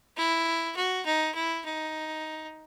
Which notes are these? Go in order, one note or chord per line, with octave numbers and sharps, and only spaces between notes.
E4
F#4
D#4
E4
D#4